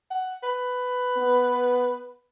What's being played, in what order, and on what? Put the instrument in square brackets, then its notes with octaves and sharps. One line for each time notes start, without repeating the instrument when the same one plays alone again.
[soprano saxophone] F#5
B4
[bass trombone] B3